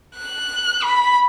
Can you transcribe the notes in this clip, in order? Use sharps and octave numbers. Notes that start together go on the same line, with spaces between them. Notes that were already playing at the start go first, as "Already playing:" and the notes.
F#6
B5